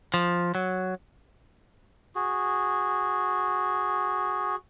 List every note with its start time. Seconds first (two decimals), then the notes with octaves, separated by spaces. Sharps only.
0.14 F3
0.55 F#3
2.15 F#4 G#4